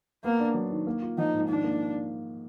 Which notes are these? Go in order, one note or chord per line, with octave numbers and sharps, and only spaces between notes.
A#3 B3
D4
F#3
D#3
A#3
F4
F3 D#4
G#2
D#3 D4
A#3